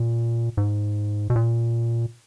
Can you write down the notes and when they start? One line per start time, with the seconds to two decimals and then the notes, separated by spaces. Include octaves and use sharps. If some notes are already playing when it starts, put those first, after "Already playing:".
Already playing: A#2
0.57 G#2
1.30 B2
1.36 A#2